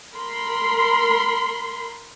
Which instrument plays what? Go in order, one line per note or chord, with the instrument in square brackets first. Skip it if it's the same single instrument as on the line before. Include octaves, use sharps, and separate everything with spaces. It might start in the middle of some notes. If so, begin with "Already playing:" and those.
[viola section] A#4 B5 C6